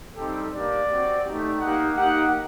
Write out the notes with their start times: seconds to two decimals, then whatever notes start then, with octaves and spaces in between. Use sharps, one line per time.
0.16 G3 C4 D#4 G4 A4
0.52 A#3 D4 G4 D5
0.89 C4 F#4
1.25 A3 D#4 G4
1.61 A#3 D#4 G4 F#5
1.97 A#3 D#4 G4 F#5